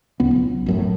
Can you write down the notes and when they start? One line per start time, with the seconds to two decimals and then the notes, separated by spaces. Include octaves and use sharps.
0.20 D1 C#2 B3
0.36 B1
0.66 F1 F#2 A2